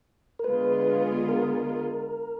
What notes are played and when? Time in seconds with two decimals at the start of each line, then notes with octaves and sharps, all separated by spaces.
0.39 A#4
0.44 D3 G#3 B3 F4 G#4 B4
1.29 A#4